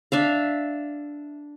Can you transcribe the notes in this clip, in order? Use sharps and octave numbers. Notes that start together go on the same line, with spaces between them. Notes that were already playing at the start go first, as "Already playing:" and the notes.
D4 E5 F5